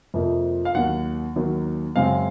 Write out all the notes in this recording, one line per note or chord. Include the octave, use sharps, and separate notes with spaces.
F2 C3 F3 A#3
F5
D#2 D#3 F#3 F#5
D#2 D#3 F#3
F#2 C#3 G#3 C4 F5